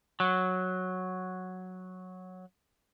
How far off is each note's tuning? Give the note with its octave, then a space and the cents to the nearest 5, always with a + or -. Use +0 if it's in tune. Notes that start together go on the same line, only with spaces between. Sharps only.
F#3 -5